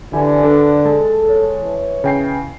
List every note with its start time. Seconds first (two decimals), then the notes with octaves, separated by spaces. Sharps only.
0.13 D3 E3 E4 G4 G#5
0.43 D4 A4 B4
0.85 G#3 A4 A5
1.27 C#5
1.62 E3
2.04 C#3 G5 C7